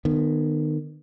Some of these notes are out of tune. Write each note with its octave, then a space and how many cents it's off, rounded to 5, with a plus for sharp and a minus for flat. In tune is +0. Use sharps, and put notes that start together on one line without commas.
D#3 -35 B3 +0